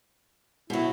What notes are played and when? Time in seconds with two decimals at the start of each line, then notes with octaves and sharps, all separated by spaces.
0.70 B2 F#3 E4